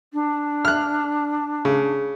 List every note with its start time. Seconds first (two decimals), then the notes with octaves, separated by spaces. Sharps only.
0.13 D4
0.65 F6 F#6
1.65 C#3